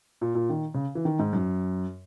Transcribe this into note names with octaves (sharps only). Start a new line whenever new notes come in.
A#2
A#2
D#3
C#3
E3
D#3
G#2
F#2